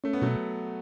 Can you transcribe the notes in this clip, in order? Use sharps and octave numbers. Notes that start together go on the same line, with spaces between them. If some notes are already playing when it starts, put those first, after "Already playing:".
A3 C#4
B3
B2 F#3 A3